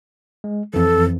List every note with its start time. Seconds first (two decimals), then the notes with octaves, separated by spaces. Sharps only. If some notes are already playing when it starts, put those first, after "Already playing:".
0.44 G#3
0.74 F2 E3 A4